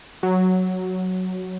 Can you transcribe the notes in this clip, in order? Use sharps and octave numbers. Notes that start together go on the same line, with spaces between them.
F#3